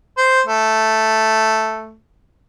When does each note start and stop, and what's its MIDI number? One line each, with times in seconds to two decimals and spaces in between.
0.17 0.41 72
0.46 1.95 57